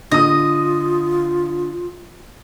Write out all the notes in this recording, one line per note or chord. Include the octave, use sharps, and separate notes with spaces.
D3 F4 D#5 D#6